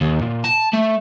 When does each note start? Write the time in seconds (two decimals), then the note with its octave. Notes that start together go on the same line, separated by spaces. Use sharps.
0.01 D#2
0.22 A#2
0.44 A5
0.74 A3